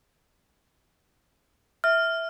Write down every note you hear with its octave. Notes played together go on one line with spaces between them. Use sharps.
E5 F6